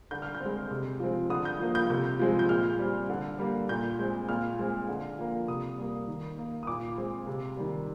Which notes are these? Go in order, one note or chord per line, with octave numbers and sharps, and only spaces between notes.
D3 G6
F6
G6
C4
G#3
C3
F3 G#3 C4
D3 D#6
G6
F3 A#3
G6
C3 G6
F3 G#3 C4
G6
A#2 F6
G3 C4
D3
G3 A#3
A#2 G6
G#3 C4
A#2 F6
G#3 C4
D3
F3 A#3
C3 D#6
G3 A#3
D#3
A#3
D#6
A#2 D6
G#3 C4
C3
D#3 G3